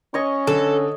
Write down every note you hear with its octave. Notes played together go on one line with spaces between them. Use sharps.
C#4 C#5 D#5 C#6
D3 A4